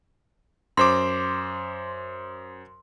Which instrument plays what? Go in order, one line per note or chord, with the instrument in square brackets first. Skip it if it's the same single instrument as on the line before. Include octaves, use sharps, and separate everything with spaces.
[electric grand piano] F#2 C5 D6 [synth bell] C6